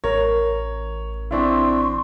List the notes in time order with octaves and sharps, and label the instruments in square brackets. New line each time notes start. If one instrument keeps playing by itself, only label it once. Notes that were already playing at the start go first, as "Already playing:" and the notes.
[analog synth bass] A1 [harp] A#4 [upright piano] C#5
[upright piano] C4 D4 E4 [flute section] C6 C#6